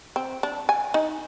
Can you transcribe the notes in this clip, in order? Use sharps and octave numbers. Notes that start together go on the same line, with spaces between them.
C4
D4
G#5
D#4